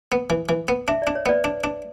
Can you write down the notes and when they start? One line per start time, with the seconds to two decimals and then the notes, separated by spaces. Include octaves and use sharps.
0.12 B3
0.30 E3
0.49 E3
0.68 B3
0.88 D4 E5
1.02 D4 D5
1.15 C#5
1.26 B3 B4 D5
1.44 D4
1.64 D4